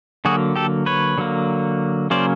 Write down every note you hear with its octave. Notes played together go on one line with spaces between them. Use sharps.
D3 F#3 A#3 F#4 G#4
G4 A4
B4 C#5
D3 F#3 A#3
C#3 F#3 A#3 C#4 C5 D5